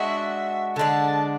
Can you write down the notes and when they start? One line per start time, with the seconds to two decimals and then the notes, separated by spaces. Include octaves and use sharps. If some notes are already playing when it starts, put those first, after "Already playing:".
Already playing: G#3 D4 F#4 E5
0.76 D3 G#3 D4 A5